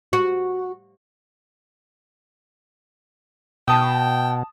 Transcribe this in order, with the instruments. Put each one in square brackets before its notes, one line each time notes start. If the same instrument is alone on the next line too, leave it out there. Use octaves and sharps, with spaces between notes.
[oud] F#4
[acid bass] B2 [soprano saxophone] G5 [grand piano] A5 D#6